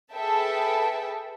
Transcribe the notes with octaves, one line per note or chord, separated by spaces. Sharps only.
G#4 A4 B4 E5 G5 A5